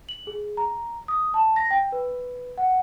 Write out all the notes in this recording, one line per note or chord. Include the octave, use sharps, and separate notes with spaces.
F#7
G#4
A#5
D#6
A5
A#6
G5
B4
F#5